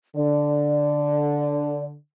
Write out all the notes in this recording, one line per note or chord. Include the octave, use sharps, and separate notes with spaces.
D3 D5